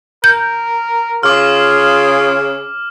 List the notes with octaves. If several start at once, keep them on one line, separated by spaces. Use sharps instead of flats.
A#4 G6
C#3 F4 D6 F6